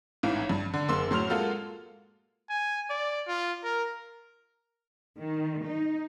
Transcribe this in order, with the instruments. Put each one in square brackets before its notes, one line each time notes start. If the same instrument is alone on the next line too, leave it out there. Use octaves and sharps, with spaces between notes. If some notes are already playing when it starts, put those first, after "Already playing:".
[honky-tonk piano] A1 G#2 E3 F5
G2
D3
F#1 A#3 C6 E6
A2 F#3 C6 F6 F7
G#3 A#3 F4 F#4 A4
[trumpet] G#5
D5
F4
A#4
[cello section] D#3
D#4